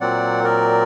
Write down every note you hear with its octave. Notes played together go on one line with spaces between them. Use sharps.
A#2 F#3 C4 D5 F#5
A#4 D5